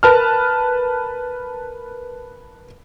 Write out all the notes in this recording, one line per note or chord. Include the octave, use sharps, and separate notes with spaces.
A#4 B4 A5 F6